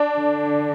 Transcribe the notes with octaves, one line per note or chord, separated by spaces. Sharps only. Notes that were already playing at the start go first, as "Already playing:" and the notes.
Already playing: D4
D3